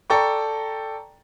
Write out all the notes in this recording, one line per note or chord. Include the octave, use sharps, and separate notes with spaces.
A4 D5 G5 A5 A#5 C#6